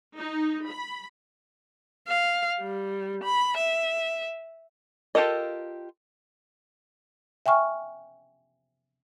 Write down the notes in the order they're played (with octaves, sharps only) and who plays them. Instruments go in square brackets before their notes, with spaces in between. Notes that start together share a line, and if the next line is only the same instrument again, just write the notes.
[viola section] D#4
B5
[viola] F5
G3
B5
E5
[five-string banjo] F4 G4 A4 A#4 D#5
[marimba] E5 G5 G#5 C#6 F6